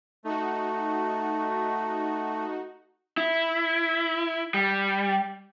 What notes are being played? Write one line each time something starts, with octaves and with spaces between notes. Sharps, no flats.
A3 D#4 F#4
E4
G3